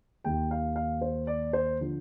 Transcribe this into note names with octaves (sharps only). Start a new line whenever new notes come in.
D#2 D#3 G5
F5
F5
C5
D5
C5
D3 F3